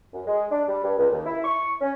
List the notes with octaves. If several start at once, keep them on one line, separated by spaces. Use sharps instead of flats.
F#2
G#3
D4
G3
G2
C#2
D#2
E4
C#6
C#4